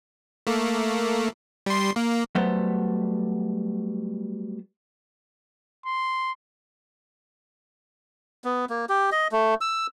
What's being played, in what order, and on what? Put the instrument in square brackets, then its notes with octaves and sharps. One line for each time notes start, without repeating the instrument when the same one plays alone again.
[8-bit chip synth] A3 A#3
G3 C6
A#3
[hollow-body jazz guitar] F#3 G3 A3 B3 A4 C5
[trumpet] C6
[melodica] B3
A#3
G4
D#5
A3
E6